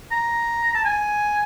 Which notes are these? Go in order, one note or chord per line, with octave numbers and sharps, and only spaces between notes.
A#5
A5
G#5